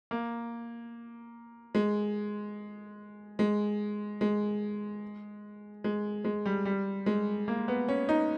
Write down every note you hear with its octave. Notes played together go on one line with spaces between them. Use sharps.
A#3
G#3
G#3
G#3
G#3
G#3
G3
G3
G#3
A#3
B3
C#4
D#4